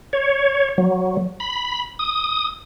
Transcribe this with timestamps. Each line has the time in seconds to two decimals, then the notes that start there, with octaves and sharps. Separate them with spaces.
0.13 C#5
0.78 F#3
1.40 B5
1.99 D#6